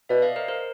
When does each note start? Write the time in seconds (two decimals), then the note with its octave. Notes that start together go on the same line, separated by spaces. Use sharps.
0.09 B2 D5 E5
0.22 D#5 F5
0.36 A#4 C5
0.48 A#4 C5